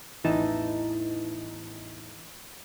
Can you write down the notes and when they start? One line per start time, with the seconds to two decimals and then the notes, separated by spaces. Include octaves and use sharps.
0.24 A1 E2 E3 D#4 A5